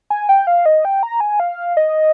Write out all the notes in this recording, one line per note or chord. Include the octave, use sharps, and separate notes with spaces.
G#5
G5
F5
D#5
G5
A#5
G#5
F5
D#5